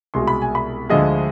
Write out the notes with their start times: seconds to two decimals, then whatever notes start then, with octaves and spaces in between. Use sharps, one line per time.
0.14 C2 B2 G#3 C6
0.28 B5
0.42 G#5
0.55 B5
0.89 D2 D3 F3 G#3 D#5